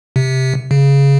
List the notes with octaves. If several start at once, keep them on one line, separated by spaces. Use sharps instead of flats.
C3
C#3